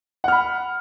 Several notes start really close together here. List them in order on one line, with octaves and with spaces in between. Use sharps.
F#5 F6 B5